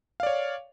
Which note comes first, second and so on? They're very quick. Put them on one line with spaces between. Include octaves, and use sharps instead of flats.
F5 D5 C#5